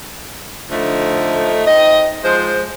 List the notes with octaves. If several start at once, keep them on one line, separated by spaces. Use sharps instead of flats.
D3 F3 A3 D#4
C4 D#4 D#5
F3 G#3 C5